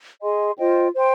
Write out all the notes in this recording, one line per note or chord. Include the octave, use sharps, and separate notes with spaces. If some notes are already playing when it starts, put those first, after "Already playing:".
G#4 D#5 G#5 C6
F4 C5 D#5 G5
C5 G5 C6